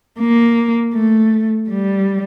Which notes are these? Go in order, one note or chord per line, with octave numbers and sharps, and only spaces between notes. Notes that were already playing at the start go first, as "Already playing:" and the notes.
A#3
A3
G3